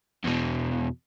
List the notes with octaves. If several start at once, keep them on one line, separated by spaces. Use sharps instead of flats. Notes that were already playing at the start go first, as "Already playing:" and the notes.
E2 B2